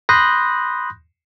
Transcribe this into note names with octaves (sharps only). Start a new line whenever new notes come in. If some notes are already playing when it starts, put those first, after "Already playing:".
B5 C6 D#6 F#6 G6 A#6